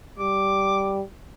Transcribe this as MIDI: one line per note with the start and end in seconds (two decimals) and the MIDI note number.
0.19 1.02 55
0.19 0.96 86